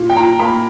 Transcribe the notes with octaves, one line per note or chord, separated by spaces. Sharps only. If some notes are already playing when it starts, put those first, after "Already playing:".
Already playing: A#2
G5
A#2 A#5
A#3 B5